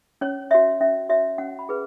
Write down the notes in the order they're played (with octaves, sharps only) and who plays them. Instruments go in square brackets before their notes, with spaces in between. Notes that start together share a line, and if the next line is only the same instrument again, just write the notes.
[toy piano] C#4 C#5
F#4 C#5 E5
C#4 E5
F#4 C#5 E5
C#4 F#5
B5
G#4 B4